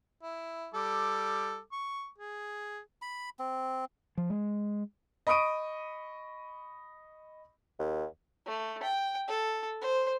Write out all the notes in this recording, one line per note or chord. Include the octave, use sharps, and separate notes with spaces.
E4
G3 A4 D6
C#6
G#4
B5
C4
F3
G#3
D#5 B5 C#6 D#6 D7 D#7
D#2
A3
G5
A4
C5